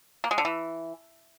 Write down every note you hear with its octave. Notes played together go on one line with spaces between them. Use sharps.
A#3
G#3
D3
E3